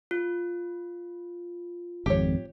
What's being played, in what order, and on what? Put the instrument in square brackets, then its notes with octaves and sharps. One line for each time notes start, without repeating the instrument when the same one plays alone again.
[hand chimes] F4
[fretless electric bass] G#1 F2 [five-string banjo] G4 C#5